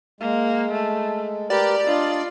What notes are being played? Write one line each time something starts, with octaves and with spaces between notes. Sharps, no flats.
G#3 A#3
A3
G4 A#4 B4 D5
D4 F4 D#5